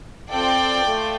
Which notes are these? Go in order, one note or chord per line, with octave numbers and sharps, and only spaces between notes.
C4 F4 A4 D5 G5
A3 F4